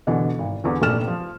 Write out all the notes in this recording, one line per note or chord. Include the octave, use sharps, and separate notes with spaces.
B2 D3 E3
G#1
E2 D3 E3
F1 A#1 A4 F6 E7
F3